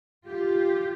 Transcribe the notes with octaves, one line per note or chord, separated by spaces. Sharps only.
F4 G4